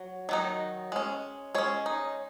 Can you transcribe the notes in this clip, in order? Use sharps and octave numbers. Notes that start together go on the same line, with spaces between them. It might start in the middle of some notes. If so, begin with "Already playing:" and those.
Already playing: F#3
D#3 F#3 D#4
G#3 C#4
G#3 C#4 C#5
D#4